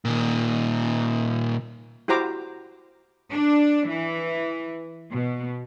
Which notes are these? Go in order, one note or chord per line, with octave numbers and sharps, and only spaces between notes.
A#2 D#3
E4 F#4 G4 C5 A#5 D6
D4
E3
B2